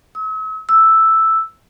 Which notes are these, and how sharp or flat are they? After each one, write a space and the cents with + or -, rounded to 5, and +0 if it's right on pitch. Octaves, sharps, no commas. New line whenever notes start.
E6 -45
E6 +0